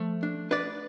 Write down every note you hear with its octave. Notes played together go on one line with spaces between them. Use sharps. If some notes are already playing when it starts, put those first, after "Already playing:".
Already playing: F3 A3
D4
D4 B4 D5